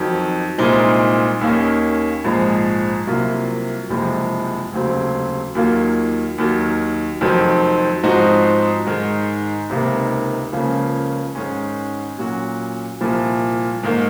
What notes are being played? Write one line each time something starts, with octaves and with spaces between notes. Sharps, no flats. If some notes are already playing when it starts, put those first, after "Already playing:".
Already playing: F2 D#3 F#3
C2 A#2 G#3 C4 D#4
D#2 D#3 A#3 C#4
A#1 G#2 F3 G#3
C2 C3 F#3 A#3 F4
F#1 F2 C3 F3 G#3
F1 D#2 C#3 F#3 C4
D#2 D#3 F#3 A#3 F4
D#2 D#3 F#3
F1 F2 D#3 F#3 C4
G#2 F3 C4 D#4 F#4
G#2 D#3 G#3
C#2 C3 D#3 A#3
C#2 C#3 F3 A#3 C#4
G#2 D#3 G#3 C#4
A#2 F#3 C#4 F#4
C2 A#2 F3
G#2 D#3 A#3